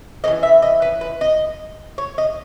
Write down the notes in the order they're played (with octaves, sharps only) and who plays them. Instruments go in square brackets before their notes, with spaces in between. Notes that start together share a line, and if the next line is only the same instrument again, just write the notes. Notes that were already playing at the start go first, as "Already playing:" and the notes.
[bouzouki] E3 A#3 C#4 D#5
E5
D#5
B4
B4
D#5
C#5
D#5